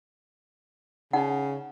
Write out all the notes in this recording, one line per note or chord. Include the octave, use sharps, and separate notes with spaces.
C#3 D#4 F#5